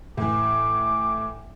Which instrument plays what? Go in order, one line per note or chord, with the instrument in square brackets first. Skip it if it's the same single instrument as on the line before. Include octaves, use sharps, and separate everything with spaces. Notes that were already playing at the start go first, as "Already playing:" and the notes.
[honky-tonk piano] A2 E3 [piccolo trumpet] D6